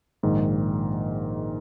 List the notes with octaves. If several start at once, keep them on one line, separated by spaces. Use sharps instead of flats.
A#1 G#2 D#3